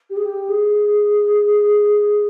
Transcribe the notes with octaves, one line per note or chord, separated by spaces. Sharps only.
G4
G#4
G4
G#4